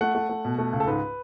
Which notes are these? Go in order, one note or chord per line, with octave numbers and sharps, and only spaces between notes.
A3 F#5
A3
A3
B2
A3
C#2
A4
G#2 B4